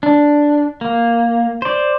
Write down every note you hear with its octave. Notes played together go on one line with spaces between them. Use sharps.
D4
A#3
C5 D5